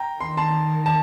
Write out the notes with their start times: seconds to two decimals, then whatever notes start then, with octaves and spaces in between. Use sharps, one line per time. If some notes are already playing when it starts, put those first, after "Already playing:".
Already playing: G5 A#5
0.20 D#3 C6
0.37 A5 C6
0.86 A5